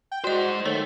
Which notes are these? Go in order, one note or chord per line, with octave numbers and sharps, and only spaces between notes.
G5
G#3 F#4 C5 D5 D#5
D#3 A3 C#5